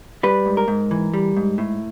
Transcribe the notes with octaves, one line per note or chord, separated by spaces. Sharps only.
G3 B4
G#2
A#4
G#2
E3
G3
G#2
A2